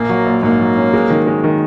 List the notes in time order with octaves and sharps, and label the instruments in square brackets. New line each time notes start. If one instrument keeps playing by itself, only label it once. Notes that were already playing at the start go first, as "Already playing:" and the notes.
Already playing: [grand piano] A#1 [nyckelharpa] A#3
[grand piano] F#3
A#1
[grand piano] G#2 [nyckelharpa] A#3
[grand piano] F#3
C#4
G#3
D#3
G#3
D#3